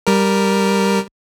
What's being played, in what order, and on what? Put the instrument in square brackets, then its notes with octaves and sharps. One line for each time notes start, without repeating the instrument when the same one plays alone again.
[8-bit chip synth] G3 A#4